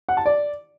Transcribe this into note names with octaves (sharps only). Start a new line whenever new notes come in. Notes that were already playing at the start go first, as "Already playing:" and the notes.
F#5
A5
D5